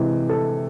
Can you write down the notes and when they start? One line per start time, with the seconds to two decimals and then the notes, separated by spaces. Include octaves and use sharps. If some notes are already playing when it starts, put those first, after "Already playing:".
Already playing: C3 E3 G#3
0.29 A4